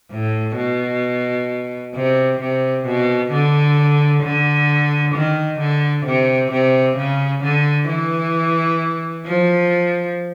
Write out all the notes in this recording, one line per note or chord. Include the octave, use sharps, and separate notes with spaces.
A2
B2
C3
C3
B2
D3
D3
D#3
D3
C3
C3
C#3
D3
E3
F3